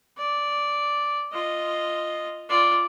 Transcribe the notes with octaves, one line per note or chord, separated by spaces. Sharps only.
D5
F4 D#5
F4 D5